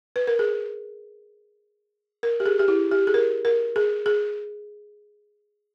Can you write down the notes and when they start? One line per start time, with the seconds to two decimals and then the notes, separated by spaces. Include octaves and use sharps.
0.16 B4
0.27 A#4
0.39 G#4
2.23 A#4
2.40 G4
2.46 G#4
2.59 G4
2.68 E4
2.91 G4
3.07 G#4
3.14 A#4
3.45 A#4
3.76 G#4
4.06 G#4